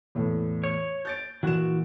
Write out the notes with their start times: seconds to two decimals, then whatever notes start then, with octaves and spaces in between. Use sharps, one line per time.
0.15 E2 A2
0.64 C#5
1.05 G6 A6 D7
1.43 A#2 E3 F#4 E7